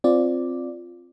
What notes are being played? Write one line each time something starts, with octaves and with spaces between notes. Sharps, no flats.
C4 F4 D5